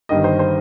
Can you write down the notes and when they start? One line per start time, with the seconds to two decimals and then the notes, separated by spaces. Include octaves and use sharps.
0.09 G1 G2 D#3 D#5
0.24 C5
0.39 C5